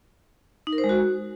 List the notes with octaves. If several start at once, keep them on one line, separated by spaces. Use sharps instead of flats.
D#4
A#4
C5
G#3
F#4